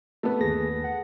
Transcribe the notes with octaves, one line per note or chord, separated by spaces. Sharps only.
A3 B3
G1 D#2 G#4 A#6
F#5